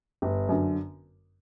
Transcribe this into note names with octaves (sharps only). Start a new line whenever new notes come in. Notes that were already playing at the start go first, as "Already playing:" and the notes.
G1
F#2 D3